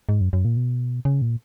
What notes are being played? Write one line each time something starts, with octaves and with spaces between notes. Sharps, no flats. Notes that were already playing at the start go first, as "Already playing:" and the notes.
G#2
F#2
F#2
A#2
B2
C#3
A#2